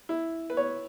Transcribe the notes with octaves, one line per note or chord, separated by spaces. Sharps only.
E4
B4
C#5